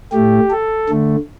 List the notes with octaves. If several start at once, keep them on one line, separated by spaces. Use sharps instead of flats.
A2 A3 G4
A4
D3 A3